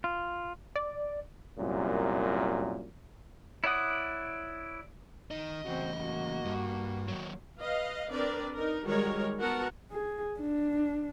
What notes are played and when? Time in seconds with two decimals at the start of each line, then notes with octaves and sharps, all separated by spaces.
0.04 F4
0.76 D5
1.57 C2 F#2 A#2
3.64 E4 C#5 D5 F#5 D#6
5.31 D#3 D#5
5.65 E2 C#3 C4 F#4
5.99 A#3 F#4
6.45 G2
7.08 D#3 F#3
7.61 B4 D#5 F5
8.11 C4 D4 A#4 B4 D5
8.55 D#4 A#4
8.85 D#3 G3 G#3 F#4 A#4 C#5
9.39 B3 F#4 A#4 F#5 A5
9.92 G#4
10.40 D4